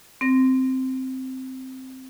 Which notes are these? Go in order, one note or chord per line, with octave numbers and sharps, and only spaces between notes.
C4 A#6